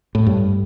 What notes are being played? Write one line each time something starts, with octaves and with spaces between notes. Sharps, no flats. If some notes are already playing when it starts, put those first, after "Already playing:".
A2
G2